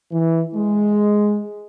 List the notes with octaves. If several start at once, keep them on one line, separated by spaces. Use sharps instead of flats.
E3
G#3